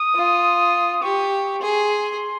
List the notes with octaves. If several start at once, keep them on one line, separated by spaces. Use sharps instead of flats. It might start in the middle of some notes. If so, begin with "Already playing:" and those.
Already playing: D#6
F4
G4 C#6
G#4 C6